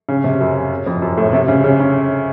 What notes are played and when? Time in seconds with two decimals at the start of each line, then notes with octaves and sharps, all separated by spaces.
0.09 C#3
0.24 C3
0.40 F#2
0.86 F2
1.02 F#2
1.18 A2
1.33 C3
1.48 C#3
1.64 C#3
1.80 C#3